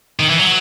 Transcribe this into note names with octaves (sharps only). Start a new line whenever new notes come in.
D#3
E3
F#3